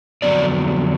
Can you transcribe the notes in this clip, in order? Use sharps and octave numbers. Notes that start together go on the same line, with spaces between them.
F2 D3 F#3 B3 D5